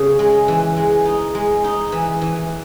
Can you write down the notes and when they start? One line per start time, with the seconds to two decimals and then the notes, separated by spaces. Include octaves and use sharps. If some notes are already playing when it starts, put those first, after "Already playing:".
Already playing: C#3
0.19 G#3
0.48 E3
0.77 G#3
1.05 D#4
1.35 G#3
1.64 D#4
1.92 E3
2.21 E3